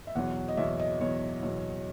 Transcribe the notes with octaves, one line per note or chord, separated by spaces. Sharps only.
E5
E2 B2 F#3 F#5
D#5
E2 B2 F#3 E5
D#5
E2 B2 F#3 C#5
E2 B2 F#3